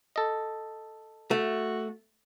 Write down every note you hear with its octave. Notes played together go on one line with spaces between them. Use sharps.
A4 D#5
A3 F#4